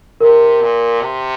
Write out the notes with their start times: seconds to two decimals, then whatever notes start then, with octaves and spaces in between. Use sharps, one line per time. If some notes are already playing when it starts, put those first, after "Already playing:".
0.21 C3 A#4
0.61 A#2
1.01 C3